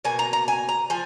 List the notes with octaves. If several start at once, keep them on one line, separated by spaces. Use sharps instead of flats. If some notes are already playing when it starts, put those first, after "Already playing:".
B2 A#3 G#5
A#5
A#5
G#5
A#5
F3 G#5